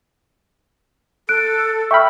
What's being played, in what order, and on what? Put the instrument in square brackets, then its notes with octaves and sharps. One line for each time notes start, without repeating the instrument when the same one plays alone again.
[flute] A4 [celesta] F#6 D7
[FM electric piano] E5 G5 B5 [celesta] C#6 F6